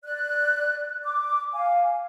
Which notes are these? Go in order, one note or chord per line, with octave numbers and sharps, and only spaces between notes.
D5 F#6
D6
F5 G#5